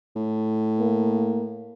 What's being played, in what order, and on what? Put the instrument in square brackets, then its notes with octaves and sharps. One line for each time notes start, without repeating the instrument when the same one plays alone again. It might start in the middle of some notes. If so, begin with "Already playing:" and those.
[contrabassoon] A2
[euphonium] A#3